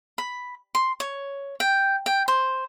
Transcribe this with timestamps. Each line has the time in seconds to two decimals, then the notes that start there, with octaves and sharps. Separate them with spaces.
0.18 B5
0.75 C6
1.00 C#5
1.60 G5
2.06 G5
2.28 C5